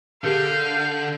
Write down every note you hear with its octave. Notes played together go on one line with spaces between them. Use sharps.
D3 G4 G#4 A#4 F5 G6